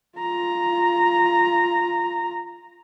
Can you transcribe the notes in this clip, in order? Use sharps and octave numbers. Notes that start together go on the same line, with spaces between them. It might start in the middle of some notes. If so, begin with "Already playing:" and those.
F4 A#5